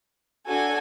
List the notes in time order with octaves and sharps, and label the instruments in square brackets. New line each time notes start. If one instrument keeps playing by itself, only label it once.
[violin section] D4 F#4 A4 G#5